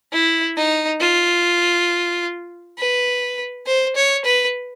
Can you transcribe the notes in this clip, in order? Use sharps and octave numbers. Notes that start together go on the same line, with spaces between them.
E4
D#4
F4
B4
C5
C#5
B4